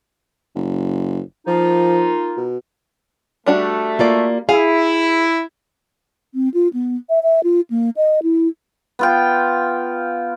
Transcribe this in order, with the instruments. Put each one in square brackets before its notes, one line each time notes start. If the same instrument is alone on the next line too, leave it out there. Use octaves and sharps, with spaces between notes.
[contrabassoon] F#1
[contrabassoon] F3 [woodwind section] A#3 D#4 F4
[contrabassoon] B2
[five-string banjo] G3 D4 F#4 [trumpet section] A3
[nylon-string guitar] A#3 F4 D5
[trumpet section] E4 [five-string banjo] G#4 [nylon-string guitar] F5
[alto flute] C4
F4
B3
E5
E5
F4
A#3
D#5
E4
[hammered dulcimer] B3 F4 G5